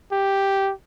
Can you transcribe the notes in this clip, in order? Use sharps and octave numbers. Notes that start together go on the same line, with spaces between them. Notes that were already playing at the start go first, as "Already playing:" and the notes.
G4